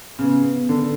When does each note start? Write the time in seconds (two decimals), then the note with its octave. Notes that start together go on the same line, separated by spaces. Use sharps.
0.19 C#3 B3
0.69 D3